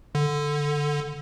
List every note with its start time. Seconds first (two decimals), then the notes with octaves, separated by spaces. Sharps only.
0.15 D3